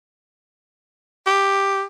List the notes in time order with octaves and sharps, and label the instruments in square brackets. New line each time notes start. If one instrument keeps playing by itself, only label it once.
[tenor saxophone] G4